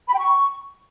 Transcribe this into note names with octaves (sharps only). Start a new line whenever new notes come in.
B5
G5
C#6